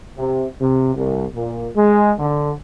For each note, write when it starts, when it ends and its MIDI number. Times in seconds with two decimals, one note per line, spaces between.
0.18 0.46 48
0.60 0.94 48
0.95 1.25 36
1.35 1.68 46
1.75 2.13 56
2.19 2.53 50